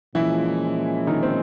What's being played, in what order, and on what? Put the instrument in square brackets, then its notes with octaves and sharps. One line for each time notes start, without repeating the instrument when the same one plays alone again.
[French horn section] A#2 F3 G#3 C#4 [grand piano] E3 E4
[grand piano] D#3 D#4
C4